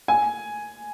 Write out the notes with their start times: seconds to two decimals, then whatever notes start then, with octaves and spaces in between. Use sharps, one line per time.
0.08 G#5